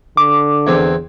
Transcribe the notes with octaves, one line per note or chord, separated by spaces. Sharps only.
D3 D6
E2 C4